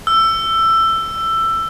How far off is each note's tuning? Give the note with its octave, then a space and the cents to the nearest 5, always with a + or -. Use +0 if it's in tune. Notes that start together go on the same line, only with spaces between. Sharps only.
E6 +15